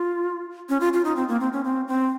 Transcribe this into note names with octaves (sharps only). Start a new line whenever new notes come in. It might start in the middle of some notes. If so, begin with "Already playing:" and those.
Already playing: F4
C#4
F4
F4
D#4
C4
A#3
C4
C#4
C4
C4